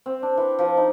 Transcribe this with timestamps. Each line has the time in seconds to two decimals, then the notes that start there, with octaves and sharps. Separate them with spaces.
0.06 C4
0.23 D4
0.37 E3
0.59 F3
0.77 D#4